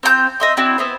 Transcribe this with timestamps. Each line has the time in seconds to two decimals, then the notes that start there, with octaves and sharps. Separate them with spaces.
0.03 C4 F4 G5 G6
0.40 D#5 E5 C6
0.57 C4 D4 E4 F#4
0.78 B3 E4 C5